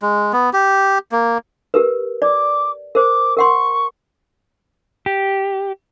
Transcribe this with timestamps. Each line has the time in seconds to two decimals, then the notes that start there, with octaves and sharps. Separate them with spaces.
0.02 G#3
0.33 B3
0.53 G4
1.12 A#3
1.74 G4 A#4 B4
2.22 D5 D6
2.95 A#4 C5 D6
3.37 A#4 F#5 C6 C#6
5.06 G4